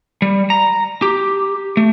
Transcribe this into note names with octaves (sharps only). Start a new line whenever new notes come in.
G3
A#5
G4
A3